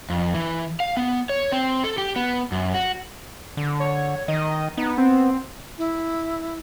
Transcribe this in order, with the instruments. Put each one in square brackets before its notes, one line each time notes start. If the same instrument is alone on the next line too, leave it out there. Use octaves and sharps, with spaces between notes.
[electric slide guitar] F2
E3
F5
B3
C#5
C4
A4
G4
B3
F#2
F#4
[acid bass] D3
[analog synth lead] C#5
[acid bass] D#3 [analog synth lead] D#5
[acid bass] B3 [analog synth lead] D#4
[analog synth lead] C4
[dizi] E4